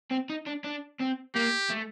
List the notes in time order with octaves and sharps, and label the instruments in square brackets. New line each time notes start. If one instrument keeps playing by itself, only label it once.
[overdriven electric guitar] C4
D#4
D4
D4
C4
[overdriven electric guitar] A#3 [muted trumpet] G4
[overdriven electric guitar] A3